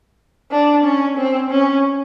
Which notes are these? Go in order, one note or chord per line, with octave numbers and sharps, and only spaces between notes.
D4
C#4
C4
C#4